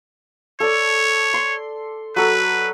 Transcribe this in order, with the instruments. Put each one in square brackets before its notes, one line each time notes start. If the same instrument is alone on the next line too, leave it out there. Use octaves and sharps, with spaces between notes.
[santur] A4 D5 [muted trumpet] C#5
[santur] C6
[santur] F#3 A4 [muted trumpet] B4